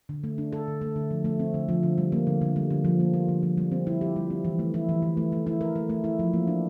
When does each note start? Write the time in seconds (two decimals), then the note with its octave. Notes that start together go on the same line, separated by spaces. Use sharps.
0.09 D3
0.24 A3
0.38 D4
0.53 A4
0.68 D3
0.81 A3
0.96 D3
1.11 F3
1.25 A3
1.39 C4
1.54 D3
1.69 F3
1.83 D3
1.98 G3
2.12 A#3
2.27 D3
2.41 D3
2.56 G3
2.70 D3
2.85 F3
3.00 A#3
3.14 F4
3.28 D3
3.43 F3
3.58 G3
3.72 C4
3.87 E4
4.01 G4
4.16 G3
4.30 C4
4.45 E3
4.59 A3
4.74 E4
4.89 E3
5.02 E3
5.17 A3
5.32 A3
5.47 E4
5.61 A#4
5.76 A3
5.90 A3
6.04 E4
6.19 F3
6.33 A#3
6.47 D4